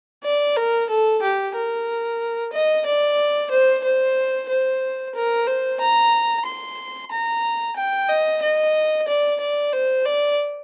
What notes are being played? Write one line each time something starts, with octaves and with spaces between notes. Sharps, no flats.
D5
A#4
A4
G4
A#4
D#5
D5
C5
C5
C5
A#4
C5
A#5
C6
A#5
G5
D#5
D#5
D5
D5
C5
D5